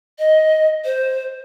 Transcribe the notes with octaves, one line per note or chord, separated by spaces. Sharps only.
D#5
C5